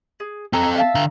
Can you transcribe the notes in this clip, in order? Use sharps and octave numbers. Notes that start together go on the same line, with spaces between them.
G#4
C4 A4 A#5 D#6 E6
E5 F5 A5
D3 A#5